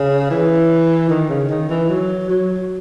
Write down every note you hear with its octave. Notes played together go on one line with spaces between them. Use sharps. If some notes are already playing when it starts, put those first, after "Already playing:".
Already playing: C#3
E3
D#3
C#3
D#3
E3
F#3
F#3